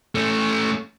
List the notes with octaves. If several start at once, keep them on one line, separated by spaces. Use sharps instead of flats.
A3 C#4